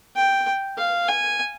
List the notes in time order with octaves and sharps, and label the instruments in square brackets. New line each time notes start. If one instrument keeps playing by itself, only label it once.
[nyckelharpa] G5
F5
G#5